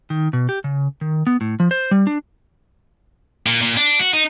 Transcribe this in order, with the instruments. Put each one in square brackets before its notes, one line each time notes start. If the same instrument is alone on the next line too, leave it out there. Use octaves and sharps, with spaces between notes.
[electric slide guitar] D#3
B2
G4
C#3
D#3
B3
A2
F3
C5
G3
D4
[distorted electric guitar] A#2
A#2
D4
F#4
D#4